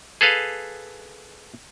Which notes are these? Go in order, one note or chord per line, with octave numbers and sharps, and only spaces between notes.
G#4 A4 B4 F5